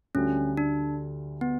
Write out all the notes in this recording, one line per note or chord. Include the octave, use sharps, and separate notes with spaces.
D2 D3 G3 C#4
D4
B3